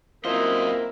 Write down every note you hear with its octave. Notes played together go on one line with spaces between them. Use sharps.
F#2 A#3 C4 E4 F4 A#4 C5 D#5